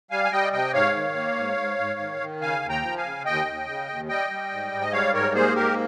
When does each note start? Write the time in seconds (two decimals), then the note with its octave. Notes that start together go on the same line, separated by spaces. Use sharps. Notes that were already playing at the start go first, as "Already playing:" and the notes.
0.11 G3 F5 G#5
0.24 G#5
0.32 G3 D#5 G5
0.53 C3 D#5 G5
0.73 G#2 C#5 F5
0.95 D#3
1.16 A#3
1.36 G#2
1.58 G#2
1.79 G#2
2.00 D#3
2.20 D#3
2.41 C#3 F5 G#5
2.62 D#2
2.69 G5 A#5
2.83 F3
2.97 F5 G#5
3.04 C#3
3.25 D#2 D#5 G5
3.46 D#2
3.67 C#3
3.88 D#2
4.09 G3 D#5 G5
4.30 G3
4.51 G#2
4.72 G#2
4.81 D#5
4.92 G3 C#5 F5
5.14 G#2 A#4 C#5
5.35 A#3 G#4 C5
5.55 G#2 G4 A#4